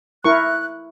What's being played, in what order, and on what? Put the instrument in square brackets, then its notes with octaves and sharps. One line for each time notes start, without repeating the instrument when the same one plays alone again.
[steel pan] E4 A#4 C#6 [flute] F#6